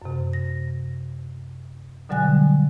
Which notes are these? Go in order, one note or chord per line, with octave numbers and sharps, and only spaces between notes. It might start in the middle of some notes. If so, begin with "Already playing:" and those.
F#2 C3
A#6
B2 D3 F#3 G3 G#5 F#6